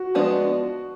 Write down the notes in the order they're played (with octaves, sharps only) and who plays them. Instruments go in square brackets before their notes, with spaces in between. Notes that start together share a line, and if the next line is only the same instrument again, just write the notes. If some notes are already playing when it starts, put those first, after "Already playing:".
Already playing: [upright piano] F#4
[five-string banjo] F3 G#3 B3 D4